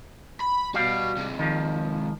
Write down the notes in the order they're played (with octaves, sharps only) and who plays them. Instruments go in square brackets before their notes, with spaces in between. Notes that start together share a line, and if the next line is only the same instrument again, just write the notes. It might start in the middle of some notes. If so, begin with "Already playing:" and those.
[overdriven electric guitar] B5
[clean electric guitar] G3 F5 [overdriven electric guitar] B3 F#4
[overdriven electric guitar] C3 G#3
[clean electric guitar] D#3 F3